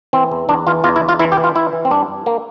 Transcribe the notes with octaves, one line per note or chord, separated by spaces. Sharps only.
E3 C4
E2
E2 D4
E3 F4
E2 F4
E4
E2
F4
E3 E4
G4
E3
F4
E3 E4
E3
C4
G2 D4
G2
A#3